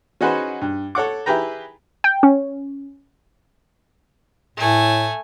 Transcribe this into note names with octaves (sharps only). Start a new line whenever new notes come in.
C#4 D#4 F#4 G#4 B4 C5
G2
A4 C#5 F#5 D6
E4 G4 G#4 B4 G5 A#5
G5
C#4
A2 A3 G#5